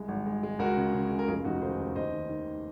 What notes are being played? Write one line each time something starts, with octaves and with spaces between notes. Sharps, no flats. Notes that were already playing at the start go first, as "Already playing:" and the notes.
Already playing: C2 G#3
G#1
G#3
G#3
C#2 F#4 A#4
C#3
C#3
C#3
A#4
F1 F4 G#4
F1 D#4 F#4
D#3 G#4 C5
D#2
D#2 C5 D#5
D#3
D#3